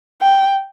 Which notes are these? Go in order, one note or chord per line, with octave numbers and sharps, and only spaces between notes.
G5